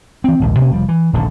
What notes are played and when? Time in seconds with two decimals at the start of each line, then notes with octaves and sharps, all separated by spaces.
0.24 E3 C4
0.40 A#1 D#2 G#2
0.59 B2 A#3 C#4
0.72 F1 F3 G3
0.89 E3
1.13 D#1 A#1 B2 D3